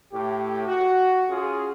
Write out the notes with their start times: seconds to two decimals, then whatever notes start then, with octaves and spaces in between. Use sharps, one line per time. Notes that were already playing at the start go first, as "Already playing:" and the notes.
0.12 A2 G4
0.67 F#4
1.29 C#4 F4 G#4